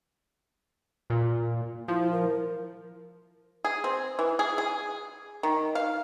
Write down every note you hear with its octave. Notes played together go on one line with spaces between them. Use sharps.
A#2
F3 E4
A#4
G#4
C4
E3
G#4
G#4
D#3
F5